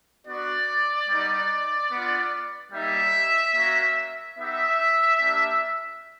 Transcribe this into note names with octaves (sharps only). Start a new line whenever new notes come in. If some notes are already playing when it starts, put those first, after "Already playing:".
B3 D4 F#4 D5
G3 B3 D#4
B3 D4 F4
G3 A#3 D#4 G4 E5
A#3 C#4 F#4
B3 D#4 G4 E5
A#3 D4 G4